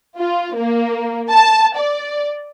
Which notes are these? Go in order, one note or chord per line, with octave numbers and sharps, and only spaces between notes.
F4
A#3
A5
D5